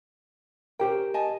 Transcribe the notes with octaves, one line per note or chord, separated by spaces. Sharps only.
C#4 G4 A#4 C5 G5
D#5 G#5 A5